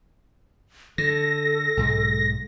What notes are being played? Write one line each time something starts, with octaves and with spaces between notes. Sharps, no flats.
D3 A4 A#6
B1 G#2 G#3